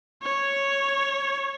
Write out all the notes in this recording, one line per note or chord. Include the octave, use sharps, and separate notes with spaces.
C#5